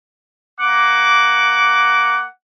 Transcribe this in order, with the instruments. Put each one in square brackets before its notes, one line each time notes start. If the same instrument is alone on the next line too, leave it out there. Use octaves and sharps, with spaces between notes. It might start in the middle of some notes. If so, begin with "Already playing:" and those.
[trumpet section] A#3 F#5 D6